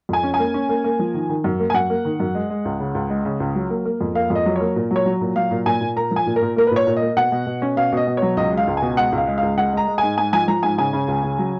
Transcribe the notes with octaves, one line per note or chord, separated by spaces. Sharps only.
F2 G#5
C#4
G#5
A#3
C#4
A#3
A#3
F3
D#3
D#3
F#2
A#3
G#5
F#2 F#5
A#3
D#3
F#2
G#3
G#3
C#2
C#3
C#2
G#3
C#3
C#2
F#3
A#3
A#3
F2
A#3 F5
F2
D#5
F#3
A#3 C#5
A#2
F#3
C#5
F#3
A#2
F#3 F5
A#2
A#2 G#5
A#2
A#3 A#5
F3
G#5
A#2
A#4
A#2
A#3 A#4
B4
A#2 C#5
A#2
A#3 D#5
B2 F#5
B2
B2
C#4
B2 F5
B2 D#5
B2
F#3 C#5
C#2 D#5
G#3
F5
C#2
G#5
B2
G#3 F#5
C#2
F5
G#3
C#2 F5
G#3 F#5
G#3 A#5
G#3
G#2 G#5
G#2 G#5
F3 G#5
F3 A#5
G#2 G#5
C#3 G#5
C#3
C#2
C#3
F#3